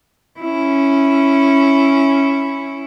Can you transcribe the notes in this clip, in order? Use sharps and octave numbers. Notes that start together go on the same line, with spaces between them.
C#4 E4